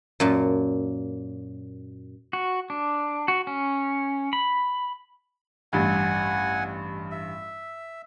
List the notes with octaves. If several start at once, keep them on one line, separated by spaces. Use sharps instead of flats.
F#2 A#2 A5
F#4
D4
F#4
C#4
B5
A1 G2 F#5 G#5
E5